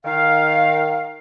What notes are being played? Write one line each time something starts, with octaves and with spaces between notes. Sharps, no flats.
D#3 F5